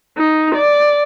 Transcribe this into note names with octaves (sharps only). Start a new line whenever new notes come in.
D#4
D5